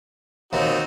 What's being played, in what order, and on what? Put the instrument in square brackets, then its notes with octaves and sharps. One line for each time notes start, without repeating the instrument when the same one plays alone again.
[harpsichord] D#2 [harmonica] C4 D#4 F#4